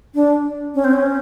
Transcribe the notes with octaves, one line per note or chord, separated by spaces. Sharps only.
D4
C#4
C4
C#4